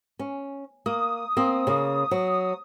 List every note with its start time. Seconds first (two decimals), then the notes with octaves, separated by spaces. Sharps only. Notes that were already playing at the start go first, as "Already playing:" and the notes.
0.19 C#4
0.86 A#3 D#6
1.37 A#3 C4
1.67 C#3 A#3
2.11 F#3